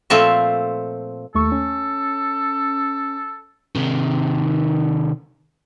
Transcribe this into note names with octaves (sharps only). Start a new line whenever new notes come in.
A#2 F3 A3 C4 A4 E5
D#2 A3 A4 C#6
C#4
C3 D#3